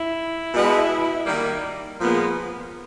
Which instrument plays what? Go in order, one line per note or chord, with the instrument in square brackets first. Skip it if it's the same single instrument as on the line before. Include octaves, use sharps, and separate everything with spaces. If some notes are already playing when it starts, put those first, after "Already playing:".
Already playing: [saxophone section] E4
B2 G#3 B3
D#3 G3 A#3
A#2 F3 G#3 B3